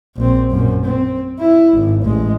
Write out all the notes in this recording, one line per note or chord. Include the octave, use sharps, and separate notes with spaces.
A#1 C4
F#2 A#2
C4
E4
G#1
A1 G#3